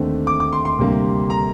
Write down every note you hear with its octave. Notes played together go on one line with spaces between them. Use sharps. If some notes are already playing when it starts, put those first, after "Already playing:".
Already playing: D#2 D3 A3 C4
D6
D6
C6
C6
D2 C3 G3 A#3
A#5